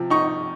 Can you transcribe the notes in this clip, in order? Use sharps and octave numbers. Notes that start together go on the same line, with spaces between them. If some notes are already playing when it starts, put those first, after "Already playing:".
Already playing: C3 F3
D#4 C#6